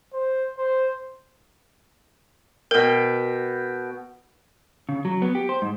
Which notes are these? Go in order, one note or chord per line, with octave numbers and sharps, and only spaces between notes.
C5
C5
B2 A#4 G5
C#3
F#3
B3
G4
C5
G#2